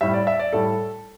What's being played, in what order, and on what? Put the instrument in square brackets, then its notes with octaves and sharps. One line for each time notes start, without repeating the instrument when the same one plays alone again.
[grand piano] A2 G3 E5
D5
E5
D5
A2 G3 A4